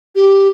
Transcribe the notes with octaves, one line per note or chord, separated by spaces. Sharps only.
G4